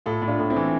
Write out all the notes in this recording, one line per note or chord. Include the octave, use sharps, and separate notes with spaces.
A2 F4 A4
A2
D4 F4
A2
C4 E4
E3